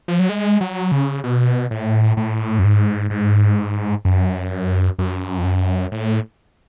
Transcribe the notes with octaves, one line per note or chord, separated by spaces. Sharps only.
F3
F#3
G#3
F#3
C#3
B2
A2
A2
F#2
G#2
G#2
F#2
F#2
F2
F#2
A2